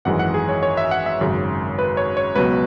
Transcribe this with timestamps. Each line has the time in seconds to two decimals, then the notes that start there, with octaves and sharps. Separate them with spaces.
0.05 G#1 F#2 E3 G#3 F#5
0.19 F#5
0.34 G#4
0.49 C#5
0.63 C#5
0.77 E5
0.91 F#5
1.06 E5
1.20 G#1 F#2 C#3
1.78 B4
1.97 C#5
2.17 C#5
2.35 C#2 B2 F#3 B4